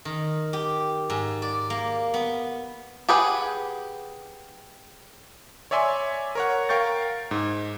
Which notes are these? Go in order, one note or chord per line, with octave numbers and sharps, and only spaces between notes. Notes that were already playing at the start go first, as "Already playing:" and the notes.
D#3
G4
G#2
D5
A#3
B3
G4 G#4 B4 F#5
C#5 D5 E5 G#5 C6 E6
A#4 C#5 F#5
A#4 F5 G5 C#6 G6 A6
G#2